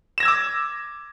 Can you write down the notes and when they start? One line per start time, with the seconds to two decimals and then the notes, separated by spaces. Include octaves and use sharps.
0.18 E7
0.20 A#6
0.23 G#6
0.25 E6
0.28 D6